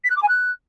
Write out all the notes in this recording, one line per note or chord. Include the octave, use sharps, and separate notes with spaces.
B6
F#6
D6
G#5
F#6